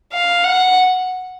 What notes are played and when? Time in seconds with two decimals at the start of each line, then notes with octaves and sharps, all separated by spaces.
0.13 F5
0.44 F#5